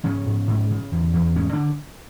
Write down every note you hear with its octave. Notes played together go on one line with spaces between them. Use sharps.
G#2 C#3 C#4
G#2
G#2
C#3
E2
E2
G#2 C#3 C#4
D3 D4